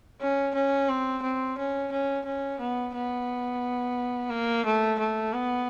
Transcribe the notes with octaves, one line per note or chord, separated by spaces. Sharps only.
C#4
C#4
C4
C4
C#4
C#4
C#4
B3
B3
A#3
A3
A3
B3